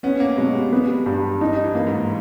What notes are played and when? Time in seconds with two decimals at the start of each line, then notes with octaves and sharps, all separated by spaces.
0.03 B3 C#4
0.20 A#3
0.37 B2 G#3
0.55 G3
0.72 G3 B3
1.06 G2
1.41 G3 D#4
1.64 E3
1.75 A#3
1.87 G#2